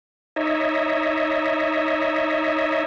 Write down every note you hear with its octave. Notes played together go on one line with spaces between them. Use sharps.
D#4 C#5 D#5 E5